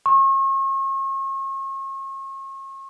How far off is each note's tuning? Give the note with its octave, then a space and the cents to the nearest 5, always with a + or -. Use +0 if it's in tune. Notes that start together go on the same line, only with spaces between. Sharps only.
C#6 -40